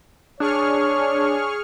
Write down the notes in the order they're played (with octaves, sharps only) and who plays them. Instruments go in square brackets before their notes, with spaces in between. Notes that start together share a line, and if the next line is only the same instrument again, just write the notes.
[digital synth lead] D4 [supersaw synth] G#4 C#6 F6 [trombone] C#5